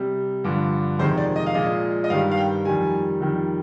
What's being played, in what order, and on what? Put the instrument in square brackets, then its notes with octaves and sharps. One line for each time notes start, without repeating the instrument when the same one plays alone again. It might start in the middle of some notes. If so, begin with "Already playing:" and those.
Already playing: [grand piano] C3 G3
G2 D3 F3
F2 C3 D#3 G#3 C5
D5
D#5
F5
A#2 F3 G#3 D#5
D#5
G2 D#3 G3 F5
F5
G5
F2 D#3 G3 G#5
F2 D#3 G3